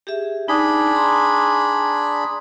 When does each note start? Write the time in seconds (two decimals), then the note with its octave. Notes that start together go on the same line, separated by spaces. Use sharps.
0.07 G4 G#4 E5
0.48 D4 D#4 G#4 B5
0.95 A#5 C6